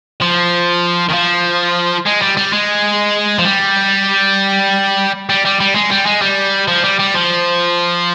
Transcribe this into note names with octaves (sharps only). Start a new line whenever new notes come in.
F3
D#3
F3
G#3
G3
G3
G#3
F3
G3
G3
G3
G3
G#3
G3
G#3
G3
F3
G3
G3
F3